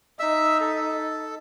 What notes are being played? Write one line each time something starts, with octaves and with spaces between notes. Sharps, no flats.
D#4 E5 E6
A4